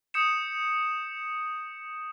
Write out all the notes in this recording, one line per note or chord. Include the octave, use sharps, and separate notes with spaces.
D#6 G6 C#7 E7